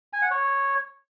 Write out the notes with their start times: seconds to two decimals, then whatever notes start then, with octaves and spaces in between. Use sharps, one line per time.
0.13 G#5
0.22 F#5
0.31 C#5